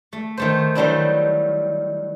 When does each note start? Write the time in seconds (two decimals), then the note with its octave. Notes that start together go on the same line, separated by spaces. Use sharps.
0.13 A3
0.37 D#3 A3 C5
0.75 D#3 F#3 G3 A3 D4 E4